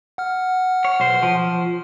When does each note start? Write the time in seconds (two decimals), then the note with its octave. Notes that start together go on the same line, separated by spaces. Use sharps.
0.18 F#5 F6
0.85 C#5
1.00 B1 C5
1.22 F3